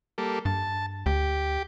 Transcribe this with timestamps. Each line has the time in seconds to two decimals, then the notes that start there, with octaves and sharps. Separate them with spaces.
0.18 G3 A#3 A4
0.45 G2 A5
1.06 D2 G4